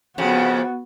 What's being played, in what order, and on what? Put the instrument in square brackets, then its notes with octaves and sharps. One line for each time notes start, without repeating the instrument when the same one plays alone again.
[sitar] F2 C#3 [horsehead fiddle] B3 F#4